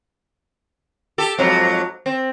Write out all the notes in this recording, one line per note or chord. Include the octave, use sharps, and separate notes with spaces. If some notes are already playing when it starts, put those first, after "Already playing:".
G4 A4
F2 G#2 F#3
C4